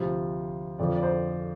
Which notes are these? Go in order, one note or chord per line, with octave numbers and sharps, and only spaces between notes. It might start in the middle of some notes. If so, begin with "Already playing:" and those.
Already playing: D2 C3 F3
F2 D3 F3 D5
D5
C5